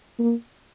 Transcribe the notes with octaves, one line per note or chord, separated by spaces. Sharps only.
A#3